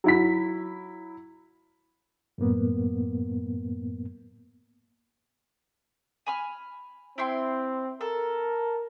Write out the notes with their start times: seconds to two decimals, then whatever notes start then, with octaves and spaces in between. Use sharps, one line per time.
0.04 F#3 E4 B6
2.38 F#2 A2 A#3 B3
6.27 G#5 B5 F6
7.18 C4 E4 G5 C6
8.01 A4 A#4